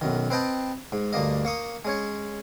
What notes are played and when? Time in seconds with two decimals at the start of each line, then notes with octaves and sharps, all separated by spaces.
0.01 B1 F#2 D#3
0.30 C4 B4 D#5 G5 A5
0.92 G#2
1.13 D2 G2 A#3 D#5
1.45 A#3 C#6 D#6
1.85 G#3 C#4 C#5